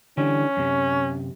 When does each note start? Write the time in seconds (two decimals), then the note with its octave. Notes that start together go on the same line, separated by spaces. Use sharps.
0.18 D3 E3 G3 C#4
0.57 F#2 C3